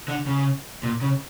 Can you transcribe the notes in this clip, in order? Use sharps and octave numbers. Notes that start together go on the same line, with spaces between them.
D3
C#3
A#2
C#3